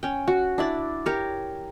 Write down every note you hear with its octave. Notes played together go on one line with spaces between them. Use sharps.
C#4 G5
F#4
D4 E4 D5
G4 A#4 C#5